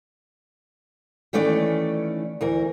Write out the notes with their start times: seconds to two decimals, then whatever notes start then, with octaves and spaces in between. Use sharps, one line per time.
1.33 D#3 E3 A3 C#4 D5
2.41 D2 E3 A#4